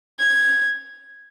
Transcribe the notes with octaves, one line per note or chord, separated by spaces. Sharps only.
G#6